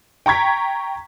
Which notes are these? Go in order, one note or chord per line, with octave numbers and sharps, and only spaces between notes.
G5 A#5 C#6 G#6 B6